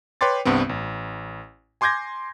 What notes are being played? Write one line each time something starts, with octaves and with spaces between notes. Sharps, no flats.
B4 C#5 G5 C6 D6 A6
C2 G2 B3 C4
A1
G#5 C6 D6 G6 G#6 A#6